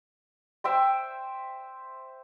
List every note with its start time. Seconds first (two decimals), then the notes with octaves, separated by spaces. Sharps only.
0.64 C5 E5 G5 C6